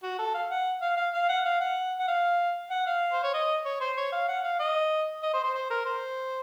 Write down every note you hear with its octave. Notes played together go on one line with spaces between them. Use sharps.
F#4
A4
F5
F#5
F5
F5
F5
F#5
F5
F#5
F#5
F5
F#5
F5
C5
C#5
D#5
C#5
C5
C#5
F5
F#5
F5
D#5
D#5
C5
C5
C5
A#4
C5